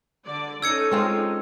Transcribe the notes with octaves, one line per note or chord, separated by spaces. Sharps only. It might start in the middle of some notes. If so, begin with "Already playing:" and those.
D3 D5
C#4 D#4 A4 E6 G#6 C#7
G#3 C4 F4